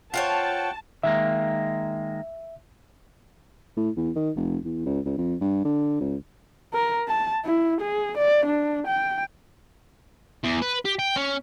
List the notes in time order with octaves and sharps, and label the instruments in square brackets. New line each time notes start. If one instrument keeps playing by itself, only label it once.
[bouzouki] F4 C5 C#5 [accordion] F#5 G5 [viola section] A5
[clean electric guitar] D#3 G#3 A#3 [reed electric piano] E5
[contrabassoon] A2
E2
D#3
F1
E2
C#2
C#2
F2
G2
D3
C#2
[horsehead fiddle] A#4
A5
E4
G#4
D5
D4
G5
[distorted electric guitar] E2
B4
G4
G5
C#4